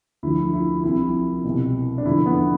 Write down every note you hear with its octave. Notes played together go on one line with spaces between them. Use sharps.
D2 D3 F3 E4
E4
C2 C3 F3 E4
C2 B2
D4
E2 D3 F3 E4
B3